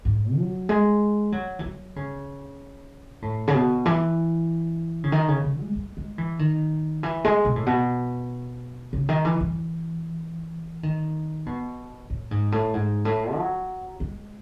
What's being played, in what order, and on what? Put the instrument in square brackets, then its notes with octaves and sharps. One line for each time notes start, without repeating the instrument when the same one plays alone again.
[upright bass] G#2
F#3
G#3
F#3
E3
F#3
C#3
A2
C#3
B2
E3
C#3
D#3
C#3
C#3
G#3
G#3
G#3
E3
D#3
E3
G#3
B2
A2
B2
C#3
D#3
E3
E3
D#3
B2
A2
G#2
A2
G#2
A2
F#3
G#3